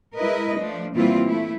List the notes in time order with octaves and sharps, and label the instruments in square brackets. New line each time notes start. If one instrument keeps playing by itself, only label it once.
[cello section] G#3 E4 A#4 B4 D#5
F3 A3 D4
A#2 E3 G3 C4 E4 F4
A3 E4